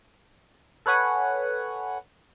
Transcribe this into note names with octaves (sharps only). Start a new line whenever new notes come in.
A4 B4 C#5 F#5 G#5